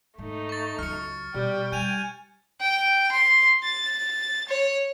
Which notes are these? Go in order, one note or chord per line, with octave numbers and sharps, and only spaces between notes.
G#2 A3 D#4
C#6 A6
C#2 F#3 F6 C#7
B2 G3 G5
G3 G#5 G6 D#7 F7
G5
C6
A6
C#5